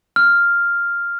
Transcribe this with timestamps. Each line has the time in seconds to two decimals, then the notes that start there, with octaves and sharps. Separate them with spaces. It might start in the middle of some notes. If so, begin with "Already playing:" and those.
0.16 F6